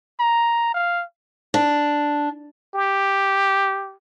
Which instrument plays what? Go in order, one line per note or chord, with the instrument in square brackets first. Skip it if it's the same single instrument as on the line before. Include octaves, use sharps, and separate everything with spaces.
[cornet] A#5
F5
[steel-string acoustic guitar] D4
[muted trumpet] G4